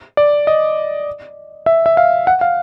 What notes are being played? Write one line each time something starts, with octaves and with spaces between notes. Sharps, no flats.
D5
D#5
E5
E5
F5
F#5
F5